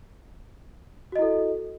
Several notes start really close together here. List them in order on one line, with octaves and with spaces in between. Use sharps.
F#4 D#5 E4 A4